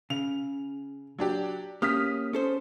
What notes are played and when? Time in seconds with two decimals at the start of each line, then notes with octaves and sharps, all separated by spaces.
0.10 C#3 F7
1.19 F#3 D4 G4
1.82 A#3 C#4 G4 D#6 F6 B6
2.33 C#4 A4 C5